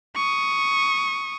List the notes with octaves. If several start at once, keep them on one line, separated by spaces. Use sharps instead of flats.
C#6 D#6